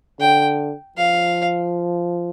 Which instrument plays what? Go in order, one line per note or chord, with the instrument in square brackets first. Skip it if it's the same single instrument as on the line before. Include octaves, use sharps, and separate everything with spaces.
[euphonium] D3 [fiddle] G5
[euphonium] F3 [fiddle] F5